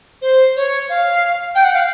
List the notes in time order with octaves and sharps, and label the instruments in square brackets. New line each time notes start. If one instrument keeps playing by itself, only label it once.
[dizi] C5
C#5
F5
G5
F#5
F5